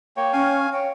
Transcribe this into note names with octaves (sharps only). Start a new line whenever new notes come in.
A#3 C#5 G5
C#4 F5 G#5
C#5 G5